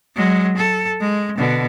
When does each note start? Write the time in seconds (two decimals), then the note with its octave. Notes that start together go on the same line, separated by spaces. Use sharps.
0.16 F#3 G#3
0.57 A4
1.01 G#3
1.38 B2 D3